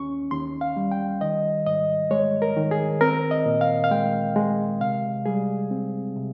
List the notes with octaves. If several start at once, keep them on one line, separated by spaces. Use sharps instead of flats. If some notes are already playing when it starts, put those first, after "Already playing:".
Already playing: D#2 C#4 C#6
D#2 C6
F5
G3
G5
D#3 D#5
G#2 D#5
G#3 C#5
A#4
D#3
G#4
C4 A#4
D#5
A#2
F5
F5
G#3 G5
G#3
C3 F5
G3 G#4
C4
C3